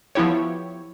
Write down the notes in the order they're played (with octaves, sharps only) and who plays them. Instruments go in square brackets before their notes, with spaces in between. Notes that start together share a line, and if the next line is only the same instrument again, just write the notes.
[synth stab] F3 B3 E4 G4 C#5